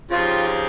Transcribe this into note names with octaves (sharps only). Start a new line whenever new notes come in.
C#3 F3 C4 D#4 F4 G4